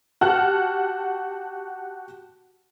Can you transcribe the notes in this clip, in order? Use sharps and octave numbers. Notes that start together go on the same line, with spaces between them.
F#4 G4 F#5 A5 F6 F#6